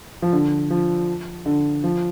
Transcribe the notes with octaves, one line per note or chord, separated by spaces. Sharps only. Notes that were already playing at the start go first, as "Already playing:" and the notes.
F3
D3
F3
D3
F3